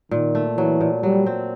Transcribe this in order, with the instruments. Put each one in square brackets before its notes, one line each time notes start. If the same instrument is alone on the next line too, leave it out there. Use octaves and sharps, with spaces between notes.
[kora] A#2 [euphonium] D#3
[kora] A3
[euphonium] E3 [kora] F#3
[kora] A#2
[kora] F#3 [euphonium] G3
[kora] C4